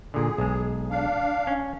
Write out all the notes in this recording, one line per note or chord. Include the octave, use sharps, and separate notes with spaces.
A#2 D3 G#4
B1 G#3
D4 F5
C#4